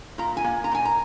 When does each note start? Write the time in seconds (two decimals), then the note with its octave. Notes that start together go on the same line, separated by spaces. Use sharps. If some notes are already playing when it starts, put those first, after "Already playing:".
0.18 A#2 A#5
0.37 G#5
0.44 A#3
0.64 A#5
0.71 A#2 G#5
0.85 A#5